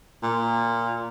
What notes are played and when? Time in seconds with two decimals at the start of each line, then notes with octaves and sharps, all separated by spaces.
0.23 A#2